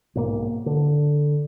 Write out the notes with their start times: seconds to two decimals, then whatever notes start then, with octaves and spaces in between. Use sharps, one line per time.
0.15 B1 G#2 A#3
0.66 D3